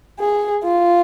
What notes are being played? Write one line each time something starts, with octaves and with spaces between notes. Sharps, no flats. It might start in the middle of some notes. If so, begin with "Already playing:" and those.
G#4
F4